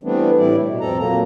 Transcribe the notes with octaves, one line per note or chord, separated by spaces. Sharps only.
E3 G3 A3 B3 C4 D4
A2 G3 E4 D5
B2
F2 C4 A4 A#5
A#2 F#3 A#3 A#5